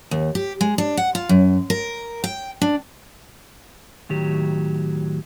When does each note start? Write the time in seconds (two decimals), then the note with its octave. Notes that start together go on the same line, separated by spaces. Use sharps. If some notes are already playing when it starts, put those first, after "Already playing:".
0.11 D#2
0.35 G4
0.61 G#3
0.78 D4
0.97 F#5
1.15 F4
1.29 F#2
1.70 A#4
2.24 G5
2.62 D4
4.09 A2 D#3 F#3 G4